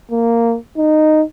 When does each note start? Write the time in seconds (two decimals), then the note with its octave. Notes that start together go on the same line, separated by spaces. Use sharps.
0.11 A#3
0.77 D#4